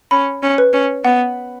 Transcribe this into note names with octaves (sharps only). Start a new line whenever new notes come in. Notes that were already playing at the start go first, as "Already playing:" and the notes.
C#4 B5
C#4
B4
C#4
B3 F#5